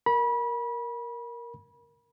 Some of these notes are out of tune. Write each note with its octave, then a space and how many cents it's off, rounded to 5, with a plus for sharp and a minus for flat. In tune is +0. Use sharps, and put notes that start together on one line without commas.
A#4 +5 B5 -30